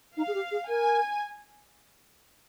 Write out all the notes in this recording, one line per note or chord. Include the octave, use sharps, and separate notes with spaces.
D#4 F5
G#4
G4
G#4
A#4 G#5